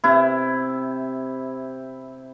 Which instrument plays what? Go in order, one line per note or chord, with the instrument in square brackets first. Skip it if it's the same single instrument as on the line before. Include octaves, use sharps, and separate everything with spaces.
[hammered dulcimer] C3 E4